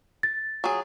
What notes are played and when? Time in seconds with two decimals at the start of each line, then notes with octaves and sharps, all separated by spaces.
0.23 A6
0.64 F#3 G#4